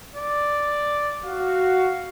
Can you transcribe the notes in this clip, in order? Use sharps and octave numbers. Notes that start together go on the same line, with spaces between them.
D5
F#4 F5